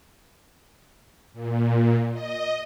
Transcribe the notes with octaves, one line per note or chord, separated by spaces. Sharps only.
A#2
D#5